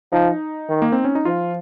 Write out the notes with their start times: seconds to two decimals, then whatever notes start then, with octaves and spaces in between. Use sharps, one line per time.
0.13 F3 D#4
0.69 D#3
0.82 A#3
0.92 C4
1.04 C#4
1.15 D#4
1.25 F3 F4